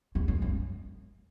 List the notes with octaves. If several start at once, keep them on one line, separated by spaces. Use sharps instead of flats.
E2
F#2
F#2